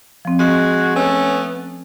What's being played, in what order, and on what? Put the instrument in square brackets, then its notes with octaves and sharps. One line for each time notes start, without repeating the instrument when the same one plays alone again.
[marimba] F3 C4
[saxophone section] G#3 F#4 [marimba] D#5
[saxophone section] A3 B3 C#4